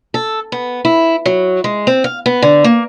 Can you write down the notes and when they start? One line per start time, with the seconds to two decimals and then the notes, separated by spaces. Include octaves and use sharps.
0.14 A4
0.52 B3
0.85 E4
1.26 F#3
1.64 G#3
1.87 C4
2.04 F5
2.26 B3
2.42 D3
2.64 A#3